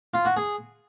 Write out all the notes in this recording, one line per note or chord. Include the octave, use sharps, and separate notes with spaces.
F4
F#4
G#4